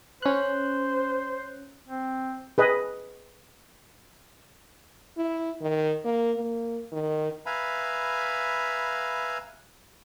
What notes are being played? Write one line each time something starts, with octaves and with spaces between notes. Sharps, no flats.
C#4 C5 F#6
C4
G#4 B4 D#5
E4
D#3
A#3
A#3
D#3
B4 E5 F5 G#5 A#5 B5